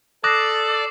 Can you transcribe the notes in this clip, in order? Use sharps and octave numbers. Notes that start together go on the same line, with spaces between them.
A4 D5 D6 D#6 F#6 A#6 C7